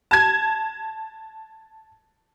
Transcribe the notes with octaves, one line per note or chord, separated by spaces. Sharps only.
A5 G#6